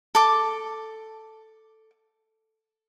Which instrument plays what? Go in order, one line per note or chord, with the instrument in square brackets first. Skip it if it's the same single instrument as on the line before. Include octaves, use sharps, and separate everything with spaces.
[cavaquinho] A4 D6